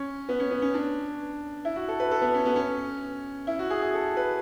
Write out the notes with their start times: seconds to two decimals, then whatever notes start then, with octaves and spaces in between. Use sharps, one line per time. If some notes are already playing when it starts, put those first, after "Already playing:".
Already playing: C#4
0.29 B3
0.40 C#4
0.51 B3
0.62 C#4
0.74 D4
1.65 E4
1.76 F#4
1.88 A4
2.00 B4
2.11 A4
2.22 B3
2.34 C#4
2.45 B3
2.56 C#4
3.47 E4
3.59 F#4
3.70 G#4
3.82 G#4
3.94 A4
4.17 B4